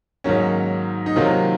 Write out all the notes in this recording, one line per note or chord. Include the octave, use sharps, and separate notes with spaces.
G#2 D#3 F#3 A#3 C#4
D#4
C3 D#3 F#3 A#3 F4